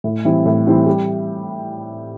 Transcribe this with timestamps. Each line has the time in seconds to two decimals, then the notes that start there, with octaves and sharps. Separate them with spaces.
0.04 A2
0.25 E3 G3 C4 E4
0.46 A2
0.66 E3 G3 C4 E4
0.87 G3